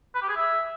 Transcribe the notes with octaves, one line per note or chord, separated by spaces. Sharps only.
B4
G4
G#4
E5